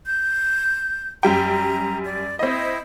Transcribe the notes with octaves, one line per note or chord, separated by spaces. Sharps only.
G6
F#2 G3 G5 A#5
D5
C4 E4 D#5